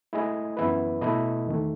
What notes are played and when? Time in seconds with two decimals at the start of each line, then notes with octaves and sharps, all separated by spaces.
0.13 A3 E4 G#4 D#5
0.57 F#2 E3 B3 E4 B4
1.01 B2 A3 E4 A4 D#5
1.47 E2 D#3 A3